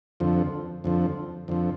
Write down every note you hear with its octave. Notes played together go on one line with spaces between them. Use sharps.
F2 D3 F3
F2 D3 F3
F2 D3 F3